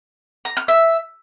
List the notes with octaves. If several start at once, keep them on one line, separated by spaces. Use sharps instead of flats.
A#5
F6
E5